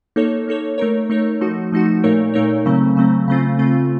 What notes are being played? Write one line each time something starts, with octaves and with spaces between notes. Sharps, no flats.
A#3 D#4 A4 C#5
A#3 D#4 A4 C#5
A3 D#4 A#4 C#5
A3 D#4 A#4 C#5
F3 A3 D#4 F#4
F3 A3 D#4 F#4
A#2 A3 D#4 A#4 C#5
A#2 A3 D#4 A#4 C#5
C#3 F#3 A3 C4
C#3 F#3 A3 C4
C#3 A3 C4 F4
C#3 A3 C4 F4